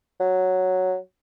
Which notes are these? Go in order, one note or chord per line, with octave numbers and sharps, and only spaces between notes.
F#3